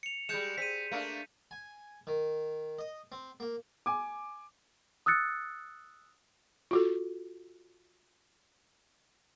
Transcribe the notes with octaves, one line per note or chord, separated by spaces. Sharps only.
C#7 F7
G3 G#3 G6 C#7 E7
C4 B6 D#7
A3 A#3 D4
G#5
D#3
D#5
C4
A#3
G#5 D6
D#6 E6 F#6 A6 C#7
F4 F#4 A4